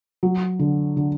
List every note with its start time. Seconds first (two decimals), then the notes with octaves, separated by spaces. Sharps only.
0.23 F#3
0.59 D3
0.97 D3